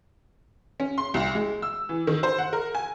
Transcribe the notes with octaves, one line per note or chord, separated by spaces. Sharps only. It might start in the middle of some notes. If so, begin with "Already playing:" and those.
C#4
C6
C2
G#3
E6
E3
D#3
C5
F#5
A#4
G#5